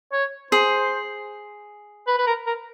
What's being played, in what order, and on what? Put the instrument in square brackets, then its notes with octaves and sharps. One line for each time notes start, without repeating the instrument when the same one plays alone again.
[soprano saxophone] C#5
[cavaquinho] G#4 [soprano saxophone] C5
[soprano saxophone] B4
B4
A#4
A#4